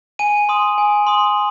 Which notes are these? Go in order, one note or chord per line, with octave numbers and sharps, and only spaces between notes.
G#5 D#7
C6 D#6
G#5
C6 D#6